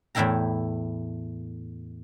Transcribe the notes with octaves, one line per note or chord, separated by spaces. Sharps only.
E2 A2 A3 E4 G5 A#5